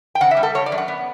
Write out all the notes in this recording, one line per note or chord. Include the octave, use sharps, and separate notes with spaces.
G5
C#3 F#5
E5
G3
A4
C#3 C#5
D5
F#2
F#5
B3